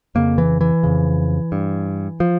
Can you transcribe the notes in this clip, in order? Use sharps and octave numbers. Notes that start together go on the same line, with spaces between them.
F2 C#3 A#3
E3
E3
F2 C#3
G2
F3